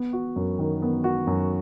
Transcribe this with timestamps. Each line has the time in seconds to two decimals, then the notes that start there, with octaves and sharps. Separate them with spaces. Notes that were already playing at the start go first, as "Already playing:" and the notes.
Already playing: B3
0.13 F#4
0.36 F#2
0.59 D#3
0.82 B3
1.04 F#4
1.27 F#2